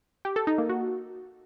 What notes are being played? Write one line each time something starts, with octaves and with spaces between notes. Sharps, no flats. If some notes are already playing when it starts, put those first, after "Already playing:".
G4
A4
D#4
A#3
F#4